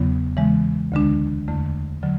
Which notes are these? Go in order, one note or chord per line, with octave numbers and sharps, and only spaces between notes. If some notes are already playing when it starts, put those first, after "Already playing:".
Already playing: E2 C#3 F#3 B3
C#3 E3 G#3
D2 D3 G#3 D4
E2 D3 A3
D3 F#3